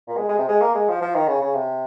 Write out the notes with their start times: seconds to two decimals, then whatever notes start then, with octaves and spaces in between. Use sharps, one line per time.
0.08 A#2
0.17 G#3
0.29 G#3
0.38 C3
0.48 G#3
0.62 A#3
0.75 G#3
0.89 F3
1.02 F3
1.15 D#3
1.28 C#3
1.41 C#3
1.54 C3